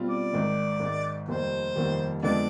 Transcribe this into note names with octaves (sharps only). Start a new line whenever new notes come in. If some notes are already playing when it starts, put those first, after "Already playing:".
Already playing: B2 G3 C4 F4
D5
G#1 G#2 D#3 G#3
G#1 G#2 D#3 G#3
F1 D#2 D#3 G3 C5
F1 D#2 D#3 G3
F2 D3 G#3 B3 D4 D5